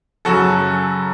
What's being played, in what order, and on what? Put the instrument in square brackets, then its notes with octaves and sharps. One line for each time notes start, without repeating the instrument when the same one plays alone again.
[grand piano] F#2 C#3 F#3 F#4 A4